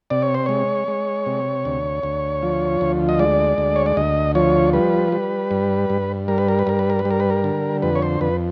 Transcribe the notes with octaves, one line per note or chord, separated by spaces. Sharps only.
C3 D5
C#5
C5
G#3 C#5
G#3
C3
D2
D2
F3
D2
D#5
G#3 D5
D2
C#5
D5
D2 D#5
F3 C#5
G3 B4
G3
G2
G2
G3 A#4
B4
A#4
B4
G2 A#4
B4
A#4
B4
G3
A#4
B4
A#4
D3
F2 B4
C#5
C5
F2 B4